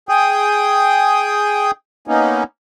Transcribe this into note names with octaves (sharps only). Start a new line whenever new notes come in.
G#4 G5 D#6
A#3 B3 C#4 D#4